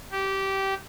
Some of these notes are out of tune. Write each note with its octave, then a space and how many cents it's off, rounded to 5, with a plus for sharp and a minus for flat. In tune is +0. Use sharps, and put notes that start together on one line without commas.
G4 -15